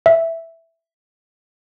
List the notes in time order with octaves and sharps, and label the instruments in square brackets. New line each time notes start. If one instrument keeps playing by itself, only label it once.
[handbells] E5